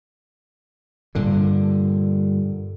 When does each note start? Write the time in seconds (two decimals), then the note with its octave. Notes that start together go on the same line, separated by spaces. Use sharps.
1.15 G2 A#2 D3